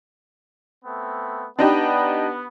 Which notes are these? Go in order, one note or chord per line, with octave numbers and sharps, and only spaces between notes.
A3 B3 C4
B3 D4 D#4 G4